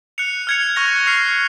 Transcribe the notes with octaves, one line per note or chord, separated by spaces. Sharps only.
F#6 C#7 F7
F6 G#6 C#7 F7
C#6 F#6 A#6 F7
F6 C7 F7